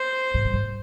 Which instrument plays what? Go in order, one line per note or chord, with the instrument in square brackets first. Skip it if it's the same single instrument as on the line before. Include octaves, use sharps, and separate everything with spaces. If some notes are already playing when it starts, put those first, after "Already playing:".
Already playing: [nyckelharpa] C5
[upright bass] G#2
G2
G#2